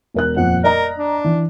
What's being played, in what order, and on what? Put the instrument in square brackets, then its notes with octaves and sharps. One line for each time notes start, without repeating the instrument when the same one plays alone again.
[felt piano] E1 A#4 F#6
[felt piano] D#1 F2 [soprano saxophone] F#5
[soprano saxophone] A#4 [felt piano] D5 D#5 A#5
[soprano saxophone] D4
[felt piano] E3